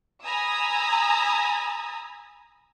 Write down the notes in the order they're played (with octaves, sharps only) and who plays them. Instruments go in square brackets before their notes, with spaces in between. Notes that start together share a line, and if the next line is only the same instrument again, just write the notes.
[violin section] G#5 A#5 B5 D#6 E6